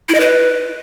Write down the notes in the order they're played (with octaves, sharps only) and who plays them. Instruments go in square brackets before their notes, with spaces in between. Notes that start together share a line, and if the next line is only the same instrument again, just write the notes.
[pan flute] E4
D#5
B4